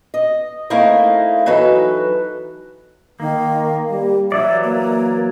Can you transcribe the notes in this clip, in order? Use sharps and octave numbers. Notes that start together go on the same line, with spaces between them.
D#5
A3 A#3 C4 D#4 E4 A#4
E3 F#3 D#4 A4 B4
D#3 A#3
G3
E3 F#3 D5 E5
A#3